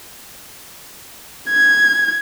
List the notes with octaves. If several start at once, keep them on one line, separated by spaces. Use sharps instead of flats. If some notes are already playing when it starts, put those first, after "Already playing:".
G#6